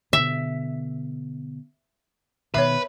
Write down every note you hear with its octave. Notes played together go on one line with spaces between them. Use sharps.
B2 D3 E5
B2 D#3 B4 C#5 E5